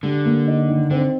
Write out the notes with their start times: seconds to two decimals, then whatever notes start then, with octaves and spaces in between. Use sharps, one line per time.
0.03 D3 G3
0.25 A#3
0.47 D#4
0.69 D#3
0.91 D3 C4